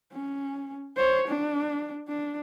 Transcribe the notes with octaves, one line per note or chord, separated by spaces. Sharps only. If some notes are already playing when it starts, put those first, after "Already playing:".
C#4
C5 C#5
D4
D4